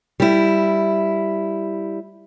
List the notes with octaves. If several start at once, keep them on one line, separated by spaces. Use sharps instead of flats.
G3 E4